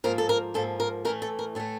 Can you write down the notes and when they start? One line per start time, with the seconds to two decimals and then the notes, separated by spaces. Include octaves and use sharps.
0.04 G#2 F3 A#3 A#4
0.18 A4
0.29 A#4
0.54 G#2 F3 A#3 A4
0.80 A#4
1.05 A2 E3 A3 A#4
1.22 A4
1.39 A#4
1.55 A2 E3 A3 A4